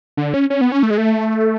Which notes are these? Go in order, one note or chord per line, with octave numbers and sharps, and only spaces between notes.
D3
C#4
C#4
B3
C#4
A3
G#3
A3